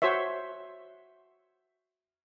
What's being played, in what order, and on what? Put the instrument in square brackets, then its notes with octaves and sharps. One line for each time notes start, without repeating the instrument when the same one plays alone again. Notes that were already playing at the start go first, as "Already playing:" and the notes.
[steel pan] F#4 C5 C#5 E5